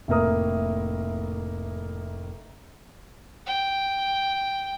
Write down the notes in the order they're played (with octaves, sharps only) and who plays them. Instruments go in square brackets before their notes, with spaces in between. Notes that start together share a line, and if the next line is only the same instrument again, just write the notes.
[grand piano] F1 A2 A3 A#3 A#4 D#6
[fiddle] G5